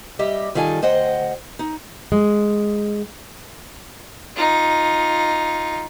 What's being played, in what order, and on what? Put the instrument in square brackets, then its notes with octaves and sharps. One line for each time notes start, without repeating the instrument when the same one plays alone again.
[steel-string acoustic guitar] G3 G4 D#5 E5
E2 D#3 G3 F4 A4 G#5
D2 C5 D#5 F#5 G5
D#4
[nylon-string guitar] G#3
[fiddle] D#4 F4